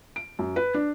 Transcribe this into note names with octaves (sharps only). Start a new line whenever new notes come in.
D7
F#2
B4
D4